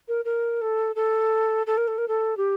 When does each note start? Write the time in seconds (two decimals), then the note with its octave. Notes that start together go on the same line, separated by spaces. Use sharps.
0.08 A#4
0.25 A#4
0.61 A4
0.96 A4
1.67 A4
1.77 A#4
1.88 A4
1.98 A#4
2.08 A4
2.37 G4